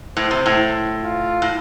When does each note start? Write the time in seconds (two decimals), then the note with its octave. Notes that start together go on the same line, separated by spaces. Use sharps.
0.17 A2 C5
0.31 C3
0.46 A2
1.03 F4
1.42 A2